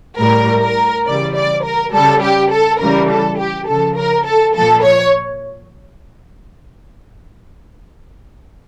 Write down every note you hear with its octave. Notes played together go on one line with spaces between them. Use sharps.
A2 G3 A#4
A#4
C#3 E3 G3 D5
D5
A#4
C#3 G3 A4
G4
A4
C#3 E3 G3 A#4
A4
G4
C#3 F3 A4
A#4
A4
A#2 F3 A4
C#5